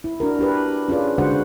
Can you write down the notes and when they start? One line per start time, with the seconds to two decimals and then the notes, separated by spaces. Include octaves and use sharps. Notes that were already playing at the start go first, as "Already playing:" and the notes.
0.04 E4
0.20 D4 F#4 A#4
0.39 D4 G4 B4
0.88 C#4 F4 G#4 B4 D5
1.18 D3 G#3 D4 F#4 C5 F#5